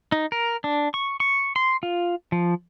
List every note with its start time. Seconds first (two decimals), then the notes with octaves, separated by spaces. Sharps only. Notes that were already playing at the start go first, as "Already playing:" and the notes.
0.12 D#4
0.32 A#4
0.64 D4
0.94 C#6
1.20 C#6
1.56 C6
1.83 F4
2.32 F3